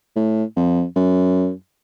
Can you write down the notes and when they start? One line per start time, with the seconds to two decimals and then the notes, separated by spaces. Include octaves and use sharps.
0.16 A2
0.56 F2
0.96 F#2